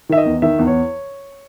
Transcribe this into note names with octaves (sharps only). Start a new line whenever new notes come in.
D#3 E5
D#5
E2
D#3 E5
E2
C#5